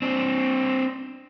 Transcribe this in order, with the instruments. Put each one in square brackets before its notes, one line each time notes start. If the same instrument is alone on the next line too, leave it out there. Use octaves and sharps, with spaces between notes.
[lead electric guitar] C4 D4